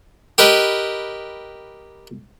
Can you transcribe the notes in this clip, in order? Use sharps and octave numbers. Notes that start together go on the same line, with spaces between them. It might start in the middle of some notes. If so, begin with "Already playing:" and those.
G4 A#4 B4 D#5